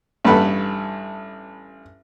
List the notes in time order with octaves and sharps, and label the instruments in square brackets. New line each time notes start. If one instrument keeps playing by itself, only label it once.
[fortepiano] A1 G2 A4 B4 F#5 B5